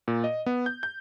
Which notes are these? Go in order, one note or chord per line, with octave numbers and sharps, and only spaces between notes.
A#2
D#5
B3
G6
G6